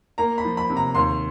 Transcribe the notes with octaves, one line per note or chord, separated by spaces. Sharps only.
A#3 A#5
B5
F3
B5
C3
A#5
D#2 C6